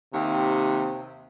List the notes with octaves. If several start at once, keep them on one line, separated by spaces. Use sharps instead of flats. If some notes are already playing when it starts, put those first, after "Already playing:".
D#2 C3